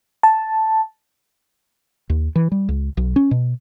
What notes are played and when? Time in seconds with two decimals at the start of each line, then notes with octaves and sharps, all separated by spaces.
0.23 A5
2.10 D#2
2.35 E3
2.52 G3
2.69 C#2
2.97 B1
3.16 C#4
3.31 B2